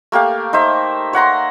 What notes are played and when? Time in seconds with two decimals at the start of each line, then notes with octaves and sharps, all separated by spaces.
0.12 A3 A#3 G4 F5
0.53 D#4 C5 E5
1.13 C#5 F#5 A#5 C6